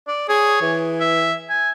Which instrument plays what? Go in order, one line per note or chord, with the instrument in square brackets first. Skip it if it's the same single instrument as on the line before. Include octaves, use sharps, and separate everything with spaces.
[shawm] D5
[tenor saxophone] G#4 [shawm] C#5
[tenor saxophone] E3
[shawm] E5
G#5